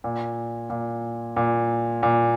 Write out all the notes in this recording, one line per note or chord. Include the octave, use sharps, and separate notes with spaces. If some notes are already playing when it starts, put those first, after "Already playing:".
A#2
A#2
A#2
A#2